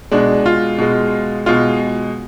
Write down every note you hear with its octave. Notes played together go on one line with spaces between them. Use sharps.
B2 G#3 D4
F4
B2 G#3
B2 G#3 F4